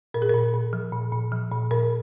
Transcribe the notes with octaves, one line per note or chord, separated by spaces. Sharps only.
A#2 A#4
G#4
A#2 A#4
A#2
F3
A#2
A#2
F3
A#2
A#2 A#4